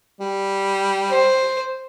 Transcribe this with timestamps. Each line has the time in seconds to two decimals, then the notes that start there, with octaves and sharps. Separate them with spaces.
0.20 G3
1.10 C5